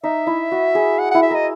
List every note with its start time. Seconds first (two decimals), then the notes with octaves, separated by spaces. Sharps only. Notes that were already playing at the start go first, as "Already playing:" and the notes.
0.03 D#4 E5
0.27 E4
0.52 F#4
0.75 G#4
0.99 F#5
1.11 E4 F#5
1.22 E5
1.31 A#4 D#5